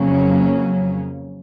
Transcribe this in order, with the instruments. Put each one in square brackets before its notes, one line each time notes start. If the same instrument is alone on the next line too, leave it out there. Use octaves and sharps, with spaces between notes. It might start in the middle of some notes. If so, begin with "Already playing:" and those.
Already playing: [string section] F2 C#3 F#3 A#3 C#4